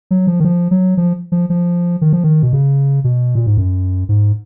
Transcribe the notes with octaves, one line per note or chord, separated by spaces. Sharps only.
F#3
F3
D#3
F3
F#3
F3
F3
F3
D#3
F3
D#3
B2
C#3
B2
A#2
G#2
F#2
G#2